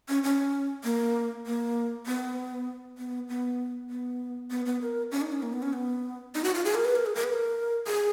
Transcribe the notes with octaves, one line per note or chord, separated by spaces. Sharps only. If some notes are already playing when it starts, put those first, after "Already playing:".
C#4
C#4
A#3
A#3
B3
B3
B3
B3
B3
B3
A#4
C#4
D#4
C#4
A#3
B3
C#4
B3
D#4
F#4
F4
G#4
A#4
B4
A#4
G#4
A#4
B4
A#4
G#4